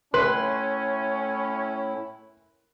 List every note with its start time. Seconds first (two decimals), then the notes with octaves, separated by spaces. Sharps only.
0.14 A2 C#4 E4 B4 C6